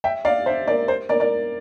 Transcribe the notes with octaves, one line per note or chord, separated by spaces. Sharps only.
E5 G5
D5 F5
C5 E5
A#4 D5
C5
A#4 D5
A#4 D5